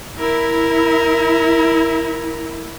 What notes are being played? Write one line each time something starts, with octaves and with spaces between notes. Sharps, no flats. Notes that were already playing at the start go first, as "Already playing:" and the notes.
E4 A#4